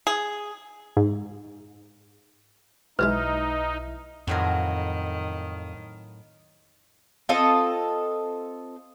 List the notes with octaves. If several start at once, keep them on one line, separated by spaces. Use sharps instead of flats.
G#4
G#2
B1 G#2 F#3 G#3 D#4 E4 B4 E5
F2 A2 D#3 F#3 A#4
C4 F4 A4 D#5